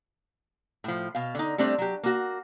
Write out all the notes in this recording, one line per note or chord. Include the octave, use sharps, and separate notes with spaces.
A2 F3
B2 F5
D3 D#4
G3 A3 C4 D4
F#3 G4
A#3 F#4